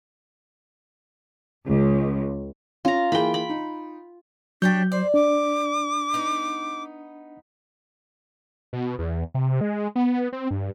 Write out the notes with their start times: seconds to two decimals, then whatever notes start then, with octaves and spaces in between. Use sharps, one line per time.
1.68 C#2
2.85 C#4 F4 A#5
3.12 E3 A#3 G#4 G5 B5
3.34 B5
3.49 D#4
4.62 F#3 D4 G4 G#4 C#5 G6
4.92 C5 D5
5.14 D4 D6
6.14 B3 D#4
8.73 B2
8.99 E2
9.35 C3
9.61 G#3
9.96 B3
10.33 C4
10.51 G2